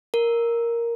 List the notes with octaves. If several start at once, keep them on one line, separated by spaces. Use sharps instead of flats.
A#4